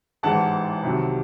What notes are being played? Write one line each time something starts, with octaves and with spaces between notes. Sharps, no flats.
A1 G#2 E3 G#3 F#5 A5
C2 C3 D#3 F#3